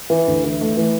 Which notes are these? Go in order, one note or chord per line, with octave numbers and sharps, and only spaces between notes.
E3
D2
E3
A3
E3